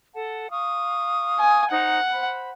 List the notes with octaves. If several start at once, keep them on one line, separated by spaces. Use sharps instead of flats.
A4 F#5 A5
F5 C#6 D#6
G#5
D#4 C5 F#5 A#5
C5 B5